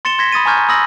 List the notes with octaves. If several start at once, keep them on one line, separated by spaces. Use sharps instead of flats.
C6 A6 C#7 E7 G7
C6 G#6 A#6 B6
B5 D#6 A6 D#7
G#5 A#5 C#6 F6 G6 G#6
B5 D#6 E6 A#6 F#7